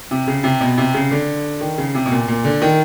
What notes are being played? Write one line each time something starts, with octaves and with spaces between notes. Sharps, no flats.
C3
C#3
C3
B2
C3
C#3
D3
D#3
C#3
C3
B2
A#2
A#2
D3
D#3